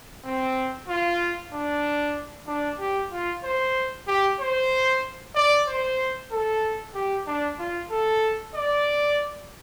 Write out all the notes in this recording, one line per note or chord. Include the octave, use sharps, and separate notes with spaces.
C4
F4
D4
D4
G4
F4
C5
G4
C5
D5
C5
A4
G4
D4
F4
A4
D5